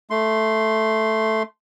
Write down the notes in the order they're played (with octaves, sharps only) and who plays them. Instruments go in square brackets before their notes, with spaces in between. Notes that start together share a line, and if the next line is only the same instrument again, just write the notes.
[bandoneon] A3 C6